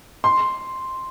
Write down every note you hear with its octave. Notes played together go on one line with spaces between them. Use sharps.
C6